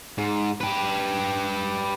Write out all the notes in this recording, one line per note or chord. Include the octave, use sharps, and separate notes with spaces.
G#2
G4 B4